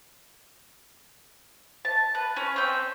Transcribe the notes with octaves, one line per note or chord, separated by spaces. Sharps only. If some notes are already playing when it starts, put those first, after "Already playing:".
A5
B4
C#4
C4 G5